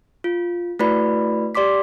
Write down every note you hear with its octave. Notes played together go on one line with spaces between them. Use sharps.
F4
A3 E4 F#4 B4 D5 B5
G4 D5 C6 D6 B6